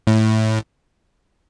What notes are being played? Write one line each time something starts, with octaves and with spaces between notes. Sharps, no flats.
A2